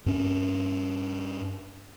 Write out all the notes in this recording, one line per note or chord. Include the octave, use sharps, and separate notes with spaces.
G2 C#4